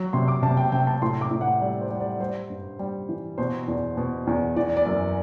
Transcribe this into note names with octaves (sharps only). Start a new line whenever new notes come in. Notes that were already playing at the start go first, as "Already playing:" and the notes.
Already playing: F#3
C3 C6
D6
C3 A5
G5
C3 G5
A5
A2 C6
D6
A2
F#5
G3 D5
C5
G3
D5
G3 C5
G2
G3
E3
B2 C5
E2
B2
E2
E3 D5
D5
F#2